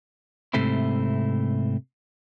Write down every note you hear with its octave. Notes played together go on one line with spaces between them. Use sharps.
G#2 C3 A3 C4 E4